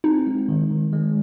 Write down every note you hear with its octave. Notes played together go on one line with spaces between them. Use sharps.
C4 D#4
G#3
D#3
D#3
G#3